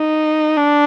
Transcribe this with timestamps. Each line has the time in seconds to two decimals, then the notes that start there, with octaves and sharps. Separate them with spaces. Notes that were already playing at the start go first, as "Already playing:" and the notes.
Already playing: D#4
0.56 D4